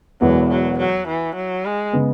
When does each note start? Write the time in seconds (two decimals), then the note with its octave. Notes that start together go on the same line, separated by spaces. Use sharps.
0.21 E1 E2 E3 F#3 B3
0.50 F#3
0.78 F#3
1.08 E3
1.35 F#3
1.65 G#3
1.93 C#3 G#3 B3